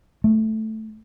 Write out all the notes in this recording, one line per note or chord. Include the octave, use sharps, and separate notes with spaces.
A3